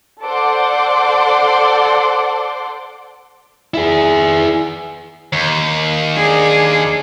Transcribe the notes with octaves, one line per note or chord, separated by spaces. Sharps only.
A4 C5 D5 F#5 C6 D6
E4 G#4
D#2
D4 G#4